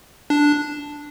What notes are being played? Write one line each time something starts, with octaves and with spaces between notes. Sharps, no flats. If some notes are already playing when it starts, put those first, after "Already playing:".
D4